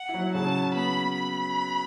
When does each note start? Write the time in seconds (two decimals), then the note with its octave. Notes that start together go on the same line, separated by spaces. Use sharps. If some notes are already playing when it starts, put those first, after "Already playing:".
Already playing: F#5
0.09 E4
0.14 F#3 F#4
0.34 C#3 C#4 A5
0.75 B3 B5
1.15 B5